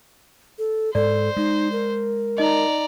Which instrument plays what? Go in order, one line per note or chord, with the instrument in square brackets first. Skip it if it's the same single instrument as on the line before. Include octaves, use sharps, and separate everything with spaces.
[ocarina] A4
[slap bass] G#2 [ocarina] A4 [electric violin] C5 [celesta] D5
[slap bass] G#3 [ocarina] D#4
[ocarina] A#4
[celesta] D#4 D#5 [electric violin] D5 A#5